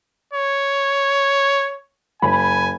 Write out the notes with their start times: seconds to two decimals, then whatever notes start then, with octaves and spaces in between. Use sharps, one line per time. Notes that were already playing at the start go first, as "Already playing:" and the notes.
0.33 C#5
2.22 F#1 G#5 B5